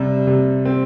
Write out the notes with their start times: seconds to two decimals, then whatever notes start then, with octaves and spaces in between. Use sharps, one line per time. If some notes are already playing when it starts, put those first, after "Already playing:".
Already playing: C3 G3
0.27 C3
0.65 C4